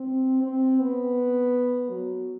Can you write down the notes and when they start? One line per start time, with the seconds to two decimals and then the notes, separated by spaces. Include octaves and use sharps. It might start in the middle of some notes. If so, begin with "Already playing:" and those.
Already playing: C4
0.43 C4
0.80 B3
1.89 F#3